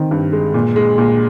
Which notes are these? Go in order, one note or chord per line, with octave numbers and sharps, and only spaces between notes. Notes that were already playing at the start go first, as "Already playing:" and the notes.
Already playing: D#3 C4
G2
G#3
A#2
G#3
A#2